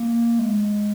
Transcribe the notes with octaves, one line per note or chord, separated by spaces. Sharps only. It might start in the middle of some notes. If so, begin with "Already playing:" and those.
Already playing: A#3
G#3